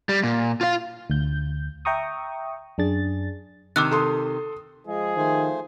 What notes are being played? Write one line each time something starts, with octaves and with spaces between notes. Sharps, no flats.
G3
A#2
F4 F5
D2 G6
E5 G5 A#5 C#6 D#6
F#2 D4 G#4 A6
C3 D#3 D6 E6 F#6
A4 C6 D#6
F3 G#3 G#4
D#3 A3 C5 G#5